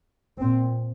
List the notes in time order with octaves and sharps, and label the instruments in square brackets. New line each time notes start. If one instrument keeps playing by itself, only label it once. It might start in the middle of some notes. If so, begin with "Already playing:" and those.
[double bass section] A#2 C4